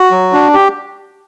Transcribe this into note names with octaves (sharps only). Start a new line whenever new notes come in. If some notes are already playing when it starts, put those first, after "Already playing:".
Already playing: F#4
F#3
D4
G4